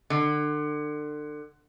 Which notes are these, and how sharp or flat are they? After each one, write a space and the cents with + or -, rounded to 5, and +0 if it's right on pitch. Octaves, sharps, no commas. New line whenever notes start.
D3 +30